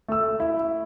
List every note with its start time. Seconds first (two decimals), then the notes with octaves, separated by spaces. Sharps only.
0.08 A3 E6
0.40 E4